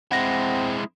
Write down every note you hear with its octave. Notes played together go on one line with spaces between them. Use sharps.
G#3 C4 E4 F#5 A#6